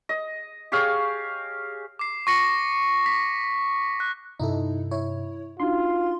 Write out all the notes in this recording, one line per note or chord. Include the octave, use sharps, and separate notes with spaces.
D#5
G4 G#4 C#5 F5
D6 C7
C#6 A#6 C#7
B6
F#6
G2 C3 D#4 E4 A4
E4 C#5
D4 D#4 F4 F#4 C6